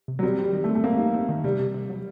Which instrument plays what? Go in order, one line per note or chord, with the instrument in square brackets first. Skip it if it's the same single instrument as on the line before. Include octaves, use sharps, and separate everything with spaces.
[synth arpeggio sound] C3
[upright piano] F#3
[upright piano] G3 [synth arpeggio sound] C4
[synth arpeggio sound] C4
[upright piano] G3
[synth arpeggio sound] D#3
[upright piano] A3
[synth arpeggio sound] C4
[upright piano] A3
[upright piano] A#3 [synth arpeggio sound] C4
[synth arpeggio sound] D#4
C4
D#3
[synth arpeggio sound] C3 [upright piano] G3
[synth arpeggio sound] C3
C3
F#3